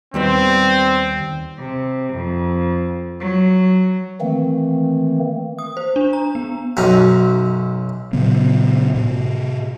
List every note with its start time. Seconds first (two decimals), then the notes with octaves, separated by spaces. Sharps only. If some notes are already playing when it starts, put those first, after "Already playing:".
0.14 D#2 G3 B3 C4
1.58 C3
2.12 F2
3.20 F#3
4.21 D#3 E3 A3 A#3 C4
5.59 D#6
5.77 C5
5.96 D4
6.13 A#5
6.35 B3
6.77 B1 F#2 D#4
8.13 A#2 C#3 F#3 B3
8.95 A2 C3